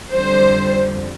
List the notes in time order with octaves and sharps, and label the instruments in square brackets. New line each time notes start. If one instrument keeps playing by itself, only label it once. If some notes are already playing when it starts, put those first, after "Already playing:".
[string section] F2 D3 G3 C5